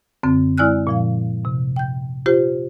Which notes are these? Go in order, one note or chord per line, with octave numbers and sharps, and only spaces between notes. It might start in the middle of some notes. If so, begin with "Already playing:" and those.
F#2 D3 C4
G#3 E4 D5 G#5 F6 F#6
A#2 F3 F5
C3
G5 G6
F4 G4 C5